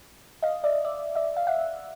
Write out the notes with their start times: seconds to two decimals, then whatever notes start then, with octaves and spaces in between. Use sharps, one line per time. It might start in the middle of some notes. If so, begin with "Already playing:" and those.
0.43 D#5 F5
0.64 D5 E5
0.85 D5 E5
1.15 D5 E5
1.36 F5
1.47 E5 F#5